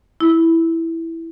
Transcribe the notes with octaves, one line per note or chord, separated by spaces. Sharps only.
E4